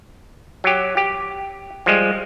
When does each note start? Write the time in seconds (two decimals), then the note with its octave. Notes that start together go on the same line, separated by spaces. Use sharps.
0.64 F#3 G4
0.97 G4
1.86 F3 G3 G#3